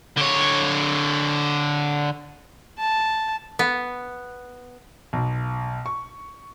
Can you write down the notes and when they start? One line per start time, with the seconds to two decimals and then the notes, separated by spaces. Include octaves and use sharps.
0.17 D3 C#5
2.79 A5
3.59 B3
5.13 B1
5.86 C#6